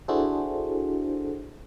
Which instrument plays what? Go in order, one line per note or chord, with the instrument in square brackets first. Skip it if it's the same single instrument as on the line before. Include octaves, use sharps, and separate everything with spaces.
[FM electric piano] D4 E4 F#4 G#4 A4 C5